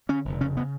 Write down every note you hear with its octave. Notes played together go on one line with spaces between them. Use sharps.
D3 C#4
F1
C#3 C#4
C#3 B3